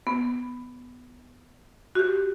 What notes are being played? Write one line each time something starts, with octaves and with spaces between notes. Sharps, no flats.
B3
F#4 G4